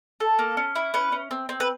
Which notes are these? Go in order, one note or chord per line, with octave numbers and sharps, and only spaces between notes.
A4
A#3
C#4
E4
C#4 B4
C#4
C4
C4
B4